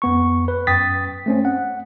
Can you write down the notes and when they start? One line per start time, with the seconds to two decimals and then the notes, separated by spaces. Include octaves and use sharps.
0.02 F2 B3 C#6
0.48 B4
0.67 F#2 G5 D#6 A6 B6
1.26 A3 C4 C#4
1.45 F#5